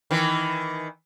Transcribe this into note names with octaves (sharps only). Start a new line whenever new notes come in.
D#3 E3